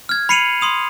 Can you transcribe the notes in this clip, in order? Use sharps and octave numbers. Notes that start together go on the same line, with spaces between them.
F6 G#6
B5 C7 C#7 D#7 F7 F#7
C6 D#6 F7